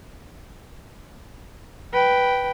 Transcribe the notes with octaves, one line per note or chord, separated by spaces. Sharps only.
B4 G5